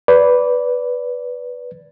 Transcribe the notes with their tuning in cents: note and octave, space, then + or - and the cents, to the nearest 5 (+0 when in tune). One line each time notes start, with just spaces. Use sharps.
B4 +0 D5 -20